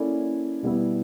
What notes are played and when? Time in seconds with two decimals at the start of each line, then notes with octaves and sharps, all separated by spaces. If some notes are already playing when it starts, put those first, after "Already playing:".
Already playing: A#3 C#4 E4 A4 D5
0.63 B2 G3 B3 E4